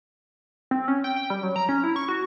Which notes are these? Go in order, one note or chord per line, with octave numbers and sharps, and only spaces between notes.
C4
C#4
G5
G5
G3
F#3
A#5
C#4
E4
C#6
F#4